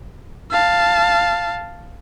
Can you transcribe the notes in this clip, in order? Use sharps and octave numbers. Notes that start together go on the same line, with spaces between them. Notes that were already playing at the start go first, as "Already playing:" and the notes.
F5 A5